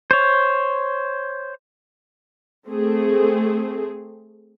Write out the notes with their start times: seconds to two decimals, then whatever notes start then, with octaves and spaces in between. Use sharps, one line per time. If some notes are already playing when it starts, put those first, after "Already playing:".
0.11 C5 C#5
2.67 A3 C4 G#4